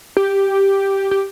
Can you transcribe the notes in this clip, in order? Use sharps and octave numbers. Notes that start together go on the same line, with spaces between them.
G4
G4